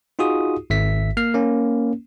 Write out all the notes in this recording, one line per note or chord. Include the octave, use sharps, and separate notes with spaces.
D#4 F4 F#4 G#4 D#6
G#1 E5 B6
A#3 F6 C7
A#3 C#4